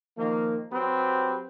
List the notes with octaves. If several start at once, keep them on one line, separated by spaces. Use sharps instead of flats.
D#3 F3 A#3
F#3 C4 G4 B4